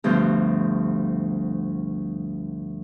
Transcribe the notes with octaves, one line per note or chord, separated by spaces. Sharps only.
D2 G2 B2 F3 C5 F#6